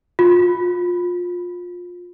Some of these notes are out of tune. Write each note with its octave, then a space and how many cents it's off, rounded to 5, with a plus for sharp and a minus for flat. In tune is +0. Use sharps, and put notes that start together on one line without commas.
F4 +20